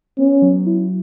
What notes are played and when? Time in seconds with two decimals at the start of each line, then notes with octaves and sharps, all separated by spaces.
0.18 B3 C#4
0.42 F#3
0.66 E4